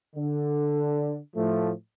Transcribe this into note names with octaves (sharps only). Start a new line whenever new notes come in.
D3
A2 F3 A3